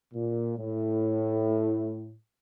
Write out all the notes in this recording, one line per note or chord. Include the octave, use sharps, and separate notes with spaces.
A#2
A2